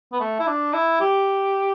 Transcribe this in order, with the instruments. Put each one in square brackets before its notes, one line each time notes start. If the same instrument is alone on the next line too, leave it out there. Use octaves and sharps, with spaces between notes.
[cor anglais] B3
A3
E4
D4
E4
G4